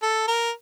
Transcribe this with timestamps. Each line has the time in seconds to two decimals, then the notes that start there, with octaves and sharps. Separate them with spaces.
0.02 A4
0.28 A#4